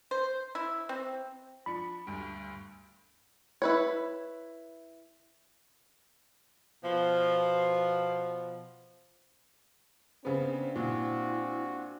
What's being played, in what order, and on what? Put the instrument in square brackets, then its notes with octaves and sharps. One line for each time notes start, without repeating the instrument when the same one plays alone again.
[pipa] C5
E4
C4
[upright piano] F3 D4 C#7 [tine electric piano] B5
[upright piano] D2 G2
[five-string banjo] E4 B4 C#5
[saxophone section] B2 F3
[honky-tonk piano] C#3 B3 [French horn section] C4 D4 [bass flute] C5
[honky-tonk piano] A#2 [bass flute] E4 [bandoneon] F#4